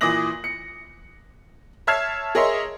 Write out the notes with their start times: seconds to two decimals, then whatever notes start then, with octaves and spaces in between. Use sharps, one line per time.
0.01 A#2 E3 D6 D#6 A#6 F#7
0.44 C#7
1.87 C#5 E5 A5 F6 G#6 C7
2.35 G#4 A#4 C#5 D#5 E5 C6